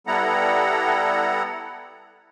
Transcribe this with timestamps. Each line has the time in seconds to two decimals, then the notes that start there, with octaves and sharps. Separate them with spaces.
0.07 G3 B3 E4 A4 F#5 A#5